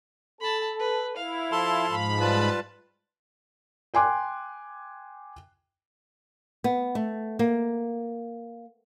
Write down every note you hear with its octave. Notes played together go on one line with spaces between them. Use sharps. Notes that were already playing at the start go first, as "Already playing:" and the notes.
A4 A5 B5
B4
E4 F5
F3 A4 A5 C6
G#2 B5
G3 F4 B4 A5
G5 G#5 C6 D6 F#6
B3
A3
A#3